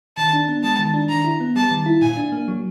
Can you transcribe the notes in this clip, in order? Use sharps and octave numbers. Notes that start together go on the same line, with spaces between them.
D#3 A5
D4
B3
G#3 A5
D#3
D4
D#3 A#5
E4
B3
G3 A5
D#3
E4
A#2 G#5
D4
A#3
F#3